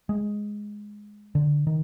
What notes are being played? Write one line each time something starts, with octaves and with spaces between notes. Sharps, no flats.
G#3
D3
D#3